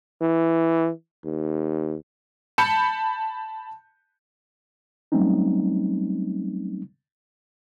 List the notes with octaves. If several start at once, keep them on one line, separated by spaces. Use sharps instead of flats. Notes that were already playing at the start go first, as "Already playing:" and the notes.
E3
D#2
A5 B5 G6 C#7
F#3 G3 A3 C4 C#4 D#4